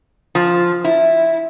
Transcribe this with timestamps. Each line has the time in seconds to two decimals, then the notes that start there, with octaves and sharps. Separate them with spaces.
0.35 F3
0.84 E4